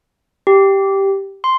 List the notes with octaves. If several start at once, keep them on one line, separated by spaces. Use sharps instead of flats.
G4
C6